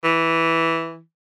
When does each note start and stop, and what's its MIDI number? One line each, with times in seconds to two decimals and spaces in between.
0.04 1.00 52